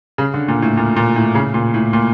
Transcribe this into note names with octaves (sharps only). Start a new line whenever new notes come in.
C#3
D3
A#2
A2
A#2
A#2
A2
C#3
A#2
A2
A#2